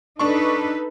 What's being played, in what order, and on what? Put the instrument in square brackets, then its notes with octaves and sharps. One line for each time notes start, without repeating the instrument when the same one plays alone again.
[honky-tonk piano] D4 C#6 [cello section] D#4 A4 B4